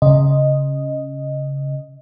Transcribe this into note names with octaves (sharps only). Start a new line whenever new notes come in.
C#3 D#5